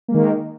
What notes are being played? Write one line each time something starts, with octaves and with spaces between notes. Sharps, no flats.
D#3 G#3 A#3